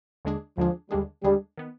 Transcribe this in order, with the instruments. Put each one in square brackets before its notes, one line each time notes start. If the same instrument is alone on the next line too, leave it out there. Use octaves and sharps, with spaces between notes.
[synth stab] D#2 D3 G#3 D4 G#4
[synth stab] D#2 D3 G#3 D4 G#4 [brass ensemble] F3
[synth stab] D#2 D3 G#3 D4 G#4 [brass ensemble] G3
[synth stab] D#2 D3 G#3 D4 G#4 [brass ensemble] G3
[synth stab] D#3 B3